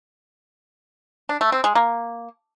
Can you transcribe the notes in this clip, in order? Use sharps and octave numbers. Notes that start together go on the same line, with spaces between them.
D4
A3
C4
G#3
A#3